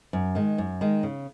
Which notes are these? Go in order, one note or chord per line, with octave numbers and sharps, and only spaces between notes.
F#2
D#3 G#3
F#2
D#3 G#3
C#3